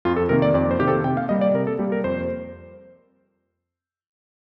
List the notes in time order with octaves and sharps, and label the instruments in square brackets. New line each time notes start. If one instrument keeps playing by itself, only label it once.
[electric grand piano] F2 F4
A4
C3 D#3 A#3 A#4
D5
F2 D5
C5
C3 D#3 A#3 G4
A4
C3 G5
F5
G3 A#3 D#5
D5
C3 A#4
A4
G3 A#3 G4
A#4
F2 C5